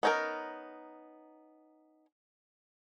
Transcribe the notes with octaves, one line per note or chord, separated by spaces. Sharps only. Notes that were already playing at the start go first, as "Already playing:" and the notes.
B3 C#4 D#4 A4 A#4